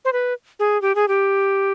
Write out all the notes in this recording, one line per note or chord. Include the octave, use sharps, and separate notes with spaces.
C5
B4
G#4
G4
G#4
G4